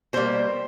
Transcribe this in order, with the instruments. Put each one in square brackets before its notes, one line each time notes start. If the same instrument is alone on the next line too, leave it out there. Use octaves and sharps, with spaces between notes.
[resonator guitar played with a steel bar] B2 G3 A#3 C5